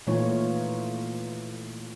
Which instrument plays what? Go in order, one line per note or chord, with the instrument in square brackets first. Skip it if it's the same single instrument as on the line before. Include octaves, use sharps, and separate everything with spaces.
[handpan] A#2 E3 A3 D#4 F4 C#5